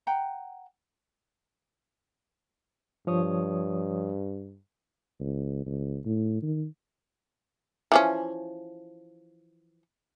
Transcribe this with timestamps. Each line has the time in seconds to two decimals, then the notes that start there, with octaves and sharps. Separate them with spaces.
0.07 F#5 G5 A#5
3.07 G2 F3 C#5 D#6
5.20 C#2
5.66 C#2
6.06 A2
6.42 D#3
7.92 E3 F3 C#4